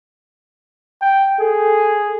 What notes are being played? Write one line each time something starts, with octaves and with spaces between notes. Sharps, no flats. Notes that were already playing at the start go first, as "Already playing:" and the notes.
G5
G#4 A4